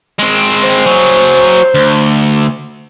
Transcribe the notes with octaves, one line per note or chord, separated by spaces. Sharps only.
G#3 C4
C5
F#3 G#4
D2